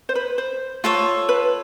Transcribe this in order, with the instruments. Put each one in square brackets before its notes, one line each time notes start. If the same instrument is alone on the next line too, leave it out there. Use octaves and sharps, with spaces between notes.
[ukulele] C5
B4
C5
[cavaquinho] F4 A4 C#5
[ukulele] B4